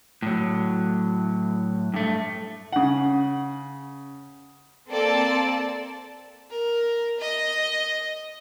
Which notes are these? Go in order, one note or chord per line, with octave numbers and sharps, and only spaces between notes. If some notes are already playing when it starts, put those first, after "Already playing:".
A2 F#3
G2 A3
C#3 F#5
A#3 C4 A4 D5 A5
A#4
D#5